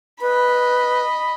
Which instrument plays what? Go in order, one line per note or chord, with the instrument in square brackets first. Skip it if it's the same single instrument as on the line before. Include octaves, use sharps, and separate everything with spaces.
[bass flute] B4 [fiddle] D#5 B5